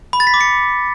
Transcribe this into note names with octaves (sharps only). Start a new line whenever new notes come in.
B5
A6
B6
D6
C#7